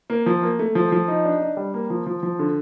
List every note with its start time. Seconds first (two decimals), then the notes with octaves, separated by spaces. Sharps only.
0.10 A#3
0.26 F3
0.43 A#3
0.59 A3
0.75 F3
0.92 F3
1.08 D#4
1.25 D4
1.42 D4
1.57 G3
1.74 A#3
1.90 F3
2.06 F3
2.23 F3
2.39 D3